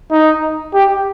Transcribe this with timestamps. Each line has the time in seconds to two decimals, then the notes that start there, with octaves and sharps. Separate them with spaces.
0.12 D#4
0.74 G4